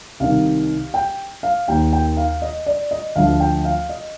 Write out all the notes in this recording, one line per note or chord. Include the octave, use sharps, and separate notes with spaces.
C2 C3 D#3 F5
G5
F5
D#2 D#3 G5
G5
F5
D#5
D5
D#5
D2 D3 F3 F5
G5
F5
D#5